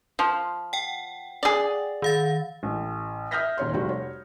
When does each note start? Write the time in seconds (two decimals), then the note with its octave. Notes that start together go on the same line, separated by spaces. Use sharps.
0.19 F3
0.73 F#5 G5
1.43 G#4 D5
2.02 D#3 F5 A6
2.63 A1
3.31 E5 D#6 F6 G6 A#6 B6
3.58 D#1 E2 C#5 C6
3.73 F1 G3 F#4
3.89 C#5